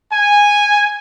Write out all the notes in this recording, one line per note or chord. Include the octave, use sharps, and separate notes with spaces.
G#5